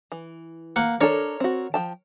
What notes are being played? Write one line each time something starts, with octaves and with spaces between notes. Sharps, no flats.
E3
A#3 F#5
D4 A4 A#4 C#5
C4 F#4
F3 G5 A5